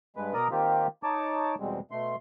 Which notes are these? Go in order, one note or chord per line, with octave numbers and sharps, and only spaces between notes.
G2 G#3 B4
B2 A#4 D5 A#5 D#6
D#3 A#3 C4 F4 G4
D#4 C#5 A5 D6
E2 B2 G3 G#3 C4
B2 A3 C6